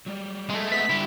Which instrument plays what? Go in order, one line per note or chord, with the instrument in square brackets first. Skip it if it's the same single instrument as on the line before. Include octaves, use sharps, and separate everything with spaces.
[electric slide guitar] F#3 G3 D5
[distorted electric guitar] G#3 A3
[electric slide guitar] B4 F#5 [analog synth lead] B6
[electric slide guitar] D3 G3 [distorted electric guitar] E4 G4